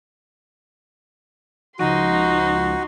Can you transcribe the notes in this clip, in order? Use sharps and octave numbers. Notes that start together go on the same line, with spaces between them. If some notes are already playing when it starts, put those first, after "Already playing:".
C#2 F3 D#4 F#4 C6